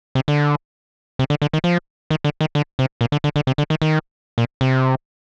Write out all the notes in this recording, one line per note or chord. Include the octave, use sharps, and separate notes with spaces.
C3
D3
C3
D3
D3
D#3
F3
D#3
D3
D#3
D3
C3
A#2
D3
D3
D3
C3
D3
D#3
D#3
A#2
C3